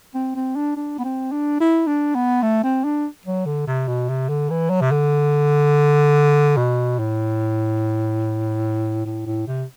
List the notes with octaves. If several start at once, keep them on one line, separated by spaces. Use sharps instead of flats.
C4
C4
D4
D4
B3
C4
D4
E4
D4
B3
A3
C4
D4
F#3
D3
C3
B2
C3
D3
E3
F#3
C3
D3
B2
A2
A2
A2
C3